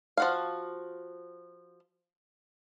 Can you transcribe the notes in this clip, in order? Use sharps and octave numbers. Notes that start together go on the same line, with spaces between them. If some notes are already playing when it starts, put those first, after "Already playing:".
F3 F#4 F5